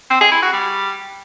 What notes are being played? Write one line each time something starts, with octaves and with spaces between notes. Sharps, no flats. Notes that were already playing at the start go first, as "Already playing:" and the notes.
C4
G#4
E4
F#4
G3